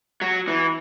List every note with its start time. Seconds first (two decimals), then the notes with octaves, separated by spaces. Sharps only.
0.21 F#3
0.48 E3